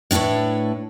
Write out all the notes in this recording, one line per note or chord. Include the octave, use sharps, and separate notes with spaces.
A2 D4 E4 B4 C#5